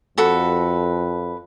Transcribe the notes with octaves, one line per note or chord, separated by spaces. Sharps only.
F2 F#4 A4 B4